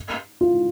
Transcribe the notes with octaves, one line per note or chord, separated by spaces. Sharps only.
F4